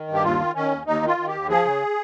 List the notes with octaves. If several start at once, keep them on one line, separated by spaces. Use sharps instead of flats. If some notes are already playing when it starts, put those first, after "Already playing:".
Already playing: D#3
G2
G4
D#2 F4
D#3
D#3 C#4
D#2
D#2 D#4
D#3
F4
D#3
G4
D#2
F3 G#4
C#3